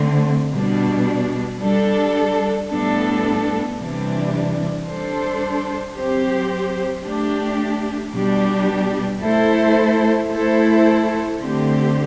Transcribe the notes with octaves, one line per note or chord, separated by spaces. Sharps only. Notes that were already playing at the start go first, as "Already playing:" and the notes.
Already playing: D3 A3 C4
B2 G3 D4
G3 D4 A4
A2 G3 B3 D4 A4
C3 E3 G3 D4
G3 D4 A4 C5
F#3 C4 G4 C5
A3 D4 G4
B2 G3 D4 G4
A3 E4 A4 C5
A3 E4 A4 C5
D3 A3 C4 G4